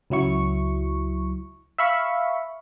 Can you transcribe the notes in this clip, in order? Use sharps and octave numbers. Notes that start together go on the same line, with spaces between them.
C#2 F#3 E4 C#6
E5 F5 B5 C#6